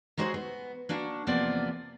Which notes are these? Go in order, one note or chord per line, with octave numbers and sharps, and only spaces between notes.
F#3 G#3 F#4 G#4 C5
B3
A#3 D4 F#4
E2 C3 F3 A#3 B3 D5